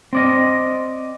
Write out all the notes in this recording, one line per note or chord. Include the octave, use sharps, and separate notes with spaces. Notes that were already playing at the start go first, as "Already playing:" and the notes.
C4 D5 D#5